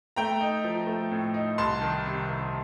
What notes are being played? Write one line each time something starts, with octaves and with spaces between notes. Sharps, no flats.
A3 G5 A#5
D#4
F3
A3
A2
D#4
C2 A5 C6
D#3
C3
C2